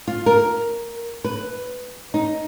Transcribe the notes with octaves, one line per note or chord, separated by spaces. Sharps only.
F4
A#4
B4
D#4